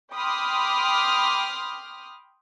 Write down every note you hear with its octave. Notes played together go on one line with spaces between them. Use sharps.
G5 B5 C6 D6 D#6 F6